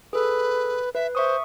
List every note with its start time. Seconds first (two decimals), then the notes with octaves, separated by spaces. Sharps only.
0.13 G#4 A4 B4
0.95 B4 E5
1.15 C5 E5 C#6 D#6